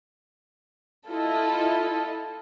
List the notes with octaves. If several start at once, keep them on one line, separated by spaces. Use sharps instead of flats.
E4 F4 A4 D#5